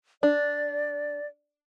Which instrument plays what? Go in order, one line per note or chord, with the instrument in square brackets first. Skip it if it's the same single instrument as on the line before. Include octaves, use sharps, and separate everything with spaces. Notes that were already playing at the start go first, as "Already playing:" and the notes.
[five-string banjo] D4 [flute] D5